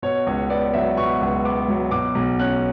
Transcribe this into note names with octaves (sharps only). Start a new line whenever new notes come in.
B2 C#5
C#2 C#5
B3 D5
F#3 E5
B2 C#6
C#2
B3 D6
F#3
B2 D6
B1
C#4 F#6